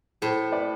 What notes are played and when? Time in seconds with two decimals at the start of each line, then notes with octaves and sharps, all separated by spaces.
0.22 A2 A4 C5
0.51 B4 D5